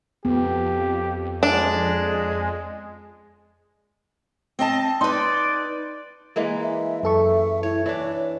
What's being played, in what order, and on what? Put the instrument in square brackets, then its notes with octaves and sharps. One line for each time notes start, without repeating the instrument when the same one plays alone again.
[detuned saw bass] F2 [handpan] B3 [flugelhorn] G4
[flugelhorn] G#3 [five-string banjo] D4
[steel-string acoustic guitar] C4 D#5 A5
[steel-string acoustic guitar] D#4 B4 [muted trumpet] D5 [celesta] C6
[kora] E3 G#3 A#3
[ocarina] E5
[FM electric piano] F#2 A4 C#6 [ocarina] E5
[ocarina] E4 [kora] C#5
[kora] E3 D4 [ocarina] C#5